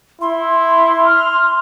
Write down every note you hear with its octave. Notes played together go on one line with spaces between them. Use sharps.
E4 C6
F6